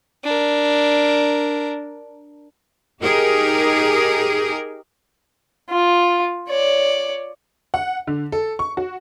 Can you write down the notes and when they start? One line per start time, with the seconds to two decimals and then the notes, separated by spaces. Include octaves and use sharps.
0.24 D4 A#4
3.03 D#4 G4 G#4 A#4
5.69 F4
6.48 C#5 D5
7.74 F#5
8.07 D3
8.32 A4
8.59 C#6
8.77 F#4